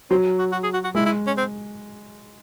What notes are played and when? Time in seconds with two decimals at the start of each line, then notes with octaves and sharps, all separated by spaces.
0.10 F#3 C4
0.39 F#4
0.52 F#4
0.63 G#4
0.73 F#4
0.84 F#4
0.95 G#3 E4
1.06 E4
1.27 C#4
1.37 C4